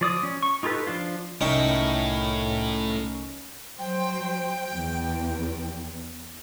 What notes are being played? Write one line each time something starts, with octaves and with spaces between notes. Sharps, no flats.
F3 D5 D#6
C#4
C#6
D#4 F4 G4 A4 B4
F3 D4 F4
C2 A2 C#4 D#4 A#4 E5 G5 C#6
F#3 C5 G5
E2